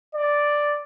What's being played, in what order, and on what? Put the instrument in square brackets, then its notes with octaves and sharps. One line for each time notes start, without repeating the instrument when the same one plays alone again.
[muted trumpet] D5